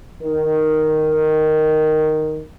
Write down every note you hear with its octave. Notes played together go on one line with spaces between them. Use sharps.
D#3 A#4